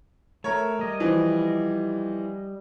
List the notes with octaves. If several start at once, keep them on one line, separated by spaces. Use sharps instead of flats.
A3 A#4 C#5
G3 D#5
E3 F3